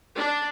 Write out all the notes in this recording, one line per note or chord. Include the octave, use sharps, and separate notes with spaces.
D4